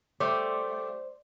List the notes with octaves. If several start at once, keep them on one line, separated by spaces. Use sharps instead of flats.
G3 A3 C5 D5 D6